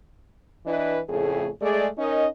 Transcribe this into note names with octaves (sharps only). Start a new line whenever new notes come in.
E3 D4 E4 B4 D#5
F2 A2 C#3 A3 G#4
G#3 A3 G#4 D5
C#4 D#4 A#4 D#5